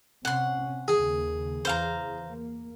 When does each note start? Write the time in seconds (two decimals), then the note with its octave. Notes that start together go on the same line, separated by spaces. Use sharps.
0.25 C3 C#4 F#5 C6
0.88 D#2 C#3 G#4
1.65 E2 C5 F5 A#5
2.29 A#3